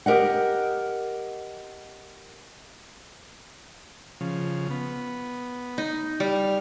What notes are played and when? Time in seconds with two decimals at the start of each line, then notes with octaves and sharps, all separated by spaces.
0.06 G4 A#4 D#5 F#5
4.21 C#3 F3
4.71 B3
5.78 D#4
6.20 G3 F6